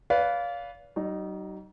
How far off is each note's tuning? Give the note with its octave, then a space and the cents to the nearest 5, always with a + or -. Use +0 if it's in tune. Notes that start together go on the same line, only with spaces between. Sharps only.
B4 +0 D5 -35 F5 +0
F#3 +45 D#4 -15